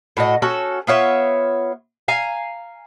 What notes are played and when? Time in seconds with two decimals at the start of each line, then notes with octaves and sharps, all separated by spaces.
0.17 A2 F#4 D#5
0.42 C#4 F#4 A4 A5
0.87 B3 F4 C#5 E5
2.08 F5 G#5 A#5